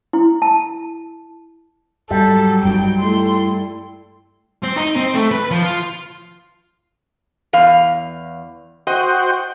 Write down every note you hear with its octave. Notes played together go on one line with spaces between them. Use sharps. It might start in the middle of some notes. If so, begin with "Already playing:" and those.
E4
A5
G#2 F#3 G3 A4
G2 D#4 G5
A3 E4 C6
C4
D#4
C4
A3
B4
F3
F4
E2 F5
F#4 C5 D#5 G5